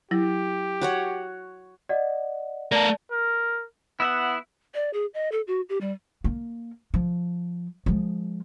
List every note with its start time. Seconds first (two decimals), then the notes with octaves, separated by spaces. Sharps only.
0.11 F#3 E4 G4 A#6
0.81 F#4 C#5 F#5
1.89 D5 D#5 F#5
2.72 A3 A#4 D5 A5
3.11 A#4
4.00 B3 E4 E5 F#5
4.74 D5
4.93 G#4
5.14 D#5
5.32 A4
5.47 F#4
5.69 G4
5.81 G3
6.24 A#3
6.94 F3
7.86 F3 G#3